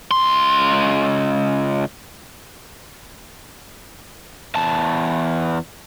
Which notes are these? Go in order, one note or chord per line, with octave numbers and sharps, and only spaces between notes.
C#2 C6
E2 A5